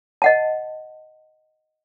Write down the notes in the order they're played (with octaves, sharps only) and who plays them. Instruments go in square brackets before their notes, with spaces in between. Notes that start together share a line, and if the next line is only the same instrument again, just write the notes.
[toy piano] D#5 F#5 A5